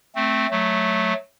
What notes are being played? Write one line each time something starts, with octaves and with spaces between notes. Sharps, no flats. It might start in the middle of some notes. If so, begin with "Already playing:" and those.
A3 C4
F#3 A3